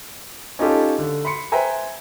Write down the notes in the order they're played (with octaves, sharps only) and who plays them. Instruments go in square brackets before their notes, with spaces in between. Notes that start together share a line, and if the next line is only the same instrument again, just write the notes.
[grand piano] C#4 D#4 F4 G4 A4
D3
B5 C6 C#7
B4 C5 E5 G5 G#5 A#5